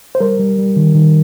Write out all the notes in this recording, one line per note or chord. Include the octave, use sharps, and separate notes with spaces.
C5
G3 A#4
G3
G3
D#3
D#3